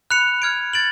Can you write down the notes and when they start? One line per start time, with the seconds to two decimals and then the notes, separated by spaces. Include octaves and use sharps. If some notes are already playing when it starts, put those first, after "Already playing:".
0.10 B5 F#6 C#7 F7
0.42 F6 G#6 D7
0.73 A6 D7 F#7